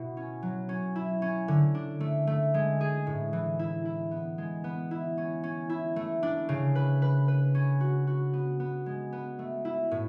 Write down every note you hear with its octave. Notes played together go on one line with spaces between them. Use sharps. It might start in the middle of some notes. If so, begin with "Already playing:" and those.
Already playing: B2 E4
C#4
F#3
C#4
E4
C#4
D3
D4
A3
A3
G#3
G#4
A2
E3
E4
E4
B3
G#3
B3
E4
C#4
C#4
E4
A3
D4
C#3
B4
B4
B4
C#4
F#4
F#4
B3
B3
G#3
B3
A3
E4
A2